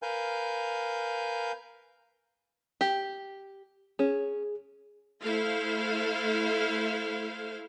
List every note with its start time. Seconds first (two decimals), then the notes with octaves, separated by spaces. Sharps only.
0.02 A#4 B4 F5 G#5 G6
2.81 G4
3.99 C#4 G#4
5.21 A3 E4 A4 C5 F5